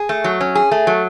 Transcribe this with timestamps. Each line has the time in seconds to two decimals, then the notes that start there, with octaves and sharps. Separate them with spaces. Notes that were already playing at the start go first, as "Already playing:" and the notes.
Already playing: G#4
0.09 A3
0.24 F#3
0.41 C#4
0.55 G#4
0.71 A3
0.87 F#3